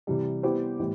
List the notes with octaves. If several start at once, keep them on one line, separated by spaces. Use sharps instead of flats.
C3 E3 G3
G3 B3 E4 G4 C5
A2 E3 G3